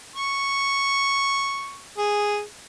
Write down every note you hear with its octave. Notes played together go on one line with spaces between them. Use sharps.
C#6
G#4